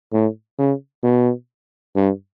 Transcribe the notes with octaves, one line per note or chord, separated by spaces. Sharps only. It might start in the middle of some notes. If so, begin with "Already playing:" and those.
A2
C#3
B2
G2